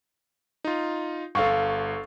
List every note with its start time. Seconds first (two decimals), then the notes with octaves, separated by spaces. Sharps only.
0.65 D#4 F4
1.35 G1 A4 F5 C#6